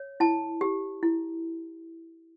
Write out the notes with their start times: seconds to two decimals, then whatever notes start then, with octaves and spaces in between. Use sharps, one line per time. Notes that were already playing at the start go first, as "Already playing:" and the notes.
Already playing: C#5
0.20 E4 A5
0.61 G4
1.03 E4